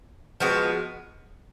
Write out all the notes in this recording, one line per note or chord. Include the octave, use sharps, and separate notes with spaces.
F3 G#3 B3 F#4